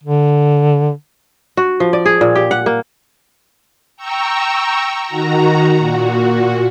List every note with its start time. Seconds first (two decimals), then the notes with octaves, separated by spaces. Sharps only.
0.04 D3
1.57 F#4
1.80 F3
1.93 D5
2.06 G#4
2.21 A#2
2.35 G4
2.51 F#5
2.66 A#3
3.97 G5 A#5 C#6 E6
5.06 D#3 F#4 A#5
5.77 A#2 F#4